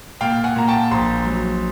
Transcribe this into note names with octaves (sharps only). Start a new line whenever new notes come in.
A#2 F5 G5
F#5 G#5
A#2 A#5
G5 A5
A#1 A#5 C6
F#3